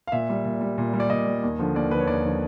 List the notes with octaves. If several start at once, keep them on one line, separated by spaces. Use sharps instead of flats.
F5
A#2 E5
G3
A#2
G3
A#2
G3
D5
A#2 D#5
G3
D#2
D3 F3
D#2 D5
D3 F3 B4
C#5
D#2 D5
D3 F3